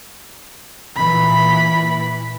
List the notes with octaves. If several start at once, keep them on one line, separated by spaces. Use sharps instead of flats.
A#2 E3 B5